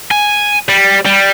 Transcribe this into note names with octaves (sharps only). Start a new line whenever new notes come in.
G#5
G3
G3